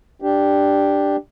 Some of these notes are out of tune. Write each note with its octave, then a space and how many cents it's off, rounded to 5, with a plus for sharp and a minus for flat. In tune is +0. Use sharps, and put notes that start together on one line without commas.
D4 +0 G4 +0